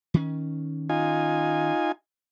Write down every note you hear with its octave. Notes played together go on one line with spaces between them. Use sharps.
D#3 C#4
D#4 F4 G#5